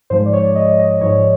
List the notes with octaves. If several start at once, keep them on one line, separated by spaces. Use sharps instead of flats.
G#2 F3 G#3 C5
D5
C#5
D5
D#5
D#5
G#2 F3 G#3 C#5